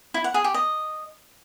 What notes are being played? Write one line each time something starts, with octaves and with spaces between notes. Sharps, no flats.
E4
F#5
G#4
G4
D#5